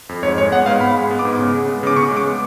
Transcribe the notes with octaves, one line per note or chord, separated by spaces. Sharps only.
F2
G#2 C#5
G#3 C#5
B3 F#5
G#2 F5
G#2 B5
G#3
B3
D6
G#2
C#3
G#3
B3
C#3 D6
C#3 C#6
G#3
D6
B3